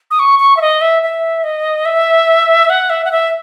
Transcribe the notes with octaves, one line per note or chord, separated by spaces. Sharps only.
D#6
C#6
C#6
E5
D#5
E5
E5
D#5
E5
F#5
E5
F#5
E5